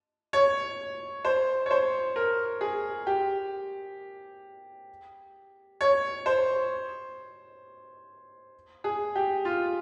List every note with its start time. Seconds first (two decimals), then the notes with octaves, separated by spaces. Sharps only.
0.33 C#5
1.25 C5
1.66 C#5
1.71 C5
2.16 A#4
2.61 G#4
3.07 G4
5.81 C#5
6.26 C5
8.84 G#4
9.16 G4
9.45 F4